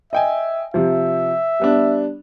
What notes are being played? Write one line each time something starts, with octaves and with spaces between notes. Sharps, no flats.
D#5 E5 G5 G#5
C3 F3 E5
G3 B3 D4